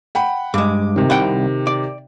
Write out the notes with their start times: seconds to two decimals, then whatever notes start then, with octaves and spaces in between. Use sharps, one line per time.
0.15 F#5 G5 B5
0.54 G2 G#3 D6
0.96 C3 D#3
1.10 C2 F#5 G5
1.67 D5